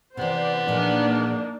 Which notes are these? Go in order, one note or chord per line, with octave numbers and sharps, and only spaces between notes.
C3 E3 B3 C5 D5
A#2 F3 G#3 A#3 D4 D#4